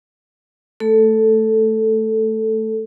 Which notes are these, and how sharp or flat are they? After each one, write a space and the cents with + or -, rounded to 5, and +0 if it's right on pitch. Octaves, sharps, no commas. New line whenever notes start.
A3 +0 A4 +0